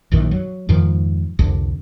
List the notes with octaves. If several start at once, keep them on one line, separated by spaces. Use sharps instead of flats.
A#1 F#2 D#3 E3
F#3
F2 G#2 D#3 F3
C2 F2 D3